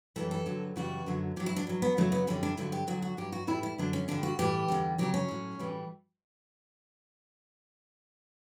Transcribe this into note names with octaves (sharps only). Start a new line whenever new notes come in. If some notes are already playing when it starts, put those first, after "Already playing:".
F#2 E3 G3 A4
A4
G2 D3 F#3
F#2 C#3 E3 G3 F#4
F#2 D3 F#3
G2 F#3 G4
E4
D4
G2 F#3
B3
F#2 C#3 F#3 A3
B3
F#2 D3 G3 C#4
D4
G2 D3 F#3 E4
G4
D2 D3 F#3 F#4
F#4
G2 F#3 G4
F#4
A2 E3 G3 E4
E4
F#2 D3 F#3 D4
C#4
G2 D3 G3 D4
F#4
A2 E3 G3 G4
E2 D3 G3
D2 C#3 F#3 G4
C#4
A2 F#3
A2 E3 G3